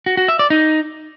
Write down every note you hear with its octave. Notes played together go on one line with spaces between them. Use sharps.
F#4
F#4
E5
D5
D#4